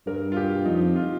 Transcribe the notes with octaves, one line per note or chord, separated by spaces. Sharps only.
G2 A#4
F4
G4
F2 D#4
F4